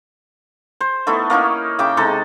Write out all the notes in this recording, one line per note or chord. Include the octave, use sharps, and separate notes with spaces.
C5
A3 B3 D#4 E4
A#3 C#4 D#4 E4
C#3 E5 G5 D6
C3 G#3 D#4 A4